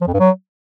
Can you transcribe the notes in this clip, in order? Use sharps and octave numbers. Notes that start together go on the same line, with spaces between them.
F3
F2
G2
F#3